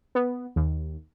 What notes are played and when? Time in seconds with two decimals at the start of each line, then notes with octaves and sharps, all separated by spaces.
0.15 B3
0.56 D#2